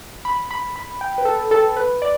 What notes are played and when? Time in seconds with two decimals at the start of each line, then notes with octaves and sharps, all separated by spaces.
0.25 B5
0.51 B5
0.76 B5
1.01 G5
1.18 B4
1.25 A4
1.51 A4
1.77 B4
2.02 D5